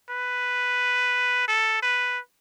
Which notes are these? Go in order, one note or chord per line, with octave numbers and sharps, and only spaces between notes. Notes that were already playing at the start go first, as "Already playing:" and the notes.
B4
A4
B4